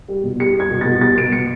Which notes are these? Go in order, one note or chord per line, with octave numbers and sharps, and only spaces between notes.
G3
B2
G3 C#7
G3 G#6
B2
A6
B2
G3 A6
B2 D7
B2 C#7